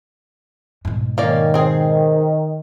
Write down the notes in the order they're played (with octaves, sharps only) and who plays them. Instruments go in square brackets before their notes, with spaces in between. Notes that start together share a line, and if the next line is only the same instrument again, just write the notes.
[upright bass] G#2 B2
[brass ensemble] D#3 [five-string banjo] A#3 C#4 D5
[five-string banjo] C4 G#4